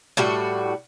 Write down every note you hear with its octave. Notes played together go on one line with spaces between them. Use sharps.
A2 G3 F#4